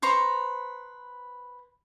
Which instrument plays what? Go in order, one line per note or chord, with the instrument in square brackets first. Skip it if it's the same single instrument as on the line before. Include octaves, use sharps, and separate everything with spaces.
[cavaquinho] B4 C5 A#5 C#6